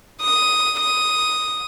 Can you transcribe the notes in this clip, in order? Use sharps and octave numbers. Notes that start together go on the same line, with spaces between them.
D#6
D#6